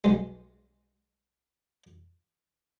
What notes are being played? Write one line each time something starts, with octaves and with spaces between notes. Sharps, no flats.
B1 G#3